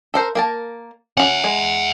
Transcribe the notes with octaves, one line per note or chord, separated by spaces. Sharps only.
A4 A#4 C5
A#3 A#4 A5
C#4 F#4 E5 F#5
G#3